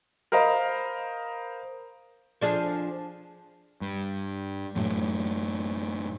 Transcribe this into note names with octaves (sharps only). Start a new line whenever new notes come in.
A#4 C5 D#5 F5 A#5 B5
F3 D4 G#4
G2
F#2 A2 F#3